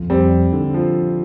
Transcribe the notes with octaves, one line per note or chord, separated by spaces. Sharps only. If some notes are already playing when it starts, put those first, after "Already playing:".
Already playing: F2
G3 C4
D3
F3